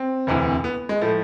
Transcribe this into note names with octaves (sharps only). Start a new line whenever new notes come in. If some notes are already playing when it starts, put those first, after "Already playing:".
Already playing: C4
E1 D2 C3 E3
B3
G#3
A2 F3 A3